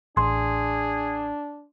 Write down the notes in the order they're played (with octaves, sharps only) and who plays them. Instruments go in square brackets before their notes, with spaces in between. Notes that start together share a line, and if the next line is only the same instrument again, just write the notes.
[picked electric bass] A1 [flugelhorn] D4 [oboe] G#4 [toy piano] C6